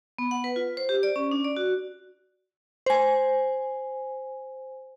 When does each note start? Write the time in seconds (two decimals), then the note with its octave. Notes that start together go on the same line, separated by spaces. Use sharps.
0.18 B3
0.31 F#5
0.44 B4
0.56 F4
0.77 C5
0.89 G4
1.03 D5
1.16 C#4
1.31 D4
1.44 D5
1.57 F#4
2.86 C5 G#5